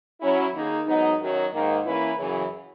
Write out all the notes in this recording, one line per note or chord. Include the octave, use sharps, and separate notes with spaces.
F#3 C#4 E4
D#3 A#3 D#4 G#4
G#2 F#3 B3 D#4
F#2 D#3 F#3
G#2 D#3 A#3
E3 A#3 C#4 E4 B4
F#2 C#3 E3